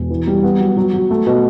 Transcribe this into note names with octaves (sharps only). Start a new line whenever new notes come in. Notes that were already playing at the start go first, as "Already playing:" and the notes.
Already playing: E1
E3
G3
B3
F#3
F#3
F#3
A3
B2